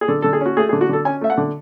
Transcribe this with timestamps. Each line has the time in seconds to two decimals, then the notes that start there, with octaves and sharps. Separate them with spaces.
0.01 G#4
0.08 D3 A4
0.22 D3 A4
0.33 G#4
0.41 C#4 F#4
0.57 A3 G#4
0.69 G#4
0.73 D3
0.81 F#4
0.89 D3 A4
1.05 C#4 G#5
1.21 A3 E5
1.30 F#5
1.38 D3